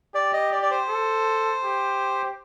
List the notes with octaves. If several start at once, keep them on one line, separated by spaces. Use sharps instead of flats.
G4 D5
D#5
D5
D5
C5
A4
G4